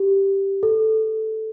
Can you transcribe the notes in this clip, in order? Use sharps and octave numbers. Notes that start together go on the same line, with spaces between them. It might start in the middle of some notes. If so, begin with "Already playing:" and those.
Already playing: G4
A4